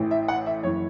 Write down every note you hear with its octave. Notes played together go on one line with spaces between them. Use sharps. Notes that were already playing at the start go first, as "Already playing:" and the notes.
Already playing: A1 A2 E3
E5
F#5
E5
F#1 E3 C#5